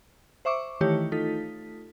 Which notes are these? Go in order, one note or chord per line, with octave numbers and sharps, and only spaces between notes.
C5 E5 C#6 D6
D#3 E3 A3 E4 G4 C#5
A3 D#4 F4 A4 B6